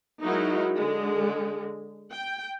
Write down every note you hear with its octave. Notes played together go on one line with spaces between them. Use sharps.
F#3 G#3 D#4 E4 F#4 A#4
D3 G#3
G5